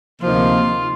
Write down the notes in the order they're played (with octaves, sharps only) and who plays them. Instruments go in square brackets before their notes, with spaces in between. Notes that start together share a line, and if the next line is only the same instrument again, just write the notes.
[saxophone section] D2 C3 F3 A#3 D#4 [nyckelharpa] F4